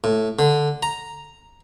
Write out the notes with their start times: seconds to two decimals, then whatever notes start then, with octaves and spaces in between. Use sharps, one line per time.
0.04 A2
0.39 D3
0.83 A#5